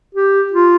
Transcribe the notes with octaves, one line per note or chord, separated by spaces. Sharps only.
G4
F4